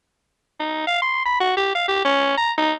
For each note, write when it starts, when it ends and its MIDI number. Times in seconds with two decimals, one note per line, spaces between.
0.60 0.83 63
0.87 0.99 77
1.02 1.21 84
1.25 1.36 83
1.40 1.53 66
1.57 1.71 67
1.75 1.87 77
1.88 2.01 67
2.05 2.34 61
2.38 2.52 82
2.58 2.73 63